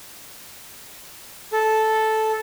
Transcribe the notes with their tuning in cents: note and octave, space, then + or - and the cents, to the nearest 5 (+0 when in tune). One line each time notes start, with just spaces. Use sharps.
A4 -10